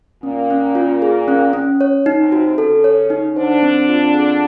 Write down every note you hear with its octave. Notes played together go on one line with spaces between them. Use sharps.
A#2 A#3 C#4
C#4
F4
G#4
C#4
C#4
C#5
D#4
C3 C4
F#4
C#3 C#4 A4
C#5
D#4
D3 D4 C5
C4
F4
G#4